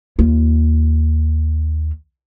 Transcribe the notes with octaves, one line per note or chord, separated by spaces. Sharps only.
D#2 F4